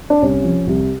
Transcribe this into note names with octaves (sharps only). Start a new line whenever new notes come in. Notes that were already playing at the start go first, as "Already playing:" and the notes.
D4
C2 C#4
F3
C2